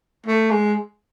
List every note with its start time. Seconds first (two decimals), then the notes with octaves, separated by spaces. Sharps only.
0.26 A3
0.51 G#3